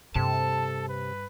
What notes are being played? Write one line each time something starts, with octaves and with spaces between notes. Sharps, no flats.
G2 C3 A4 A5
B4